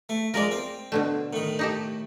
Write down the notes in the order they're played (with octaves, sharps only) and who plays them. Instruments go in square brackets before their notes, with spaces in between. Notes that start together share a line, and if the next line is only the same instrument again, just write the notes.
[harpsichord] A3
[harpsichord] F3 G#3 [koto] A#4 D5
[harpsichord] C4
[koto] B2 D3 A3
[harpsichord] A2 D#3
[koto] D#4 G4 A4